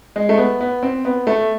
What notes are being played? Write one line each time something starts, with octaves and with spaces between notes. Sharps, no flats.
G#3
A3
B3
B3
C4
B3
A3